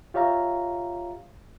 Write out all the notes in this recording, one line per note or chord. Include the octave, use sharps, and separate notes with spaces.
F4 G4 C#5 E5 F5 A#5